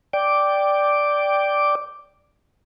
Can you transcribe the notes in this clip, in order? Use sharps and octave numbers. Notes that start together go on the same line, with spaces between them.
D5 G5 D6